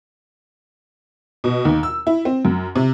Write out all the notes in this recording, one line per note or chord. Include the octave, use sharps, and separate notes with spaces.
B2
D#2
E6
E4
C4
F#2
C3